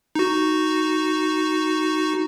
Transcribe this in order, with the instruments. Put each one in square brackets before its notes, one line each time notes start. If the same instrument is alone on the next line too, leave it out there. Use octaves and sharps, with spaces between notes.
[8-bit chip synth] D#4 F#4